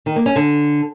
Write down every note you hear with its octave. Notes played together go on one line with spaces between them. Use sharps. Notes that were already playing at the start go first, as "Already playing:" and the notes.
D#3
A#3
C#4
D3